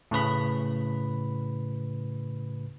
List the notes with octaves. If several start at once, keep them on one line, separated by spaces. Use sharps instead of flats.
A2 C#3 B4 B5